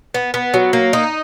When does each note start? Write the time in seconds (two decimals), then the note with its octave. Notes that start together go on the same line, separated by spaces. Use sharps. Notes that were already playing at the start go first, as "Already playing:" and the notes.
0.14 B3
0.34 B3
0.54 F#3
0.73 A#3
0.93 D#4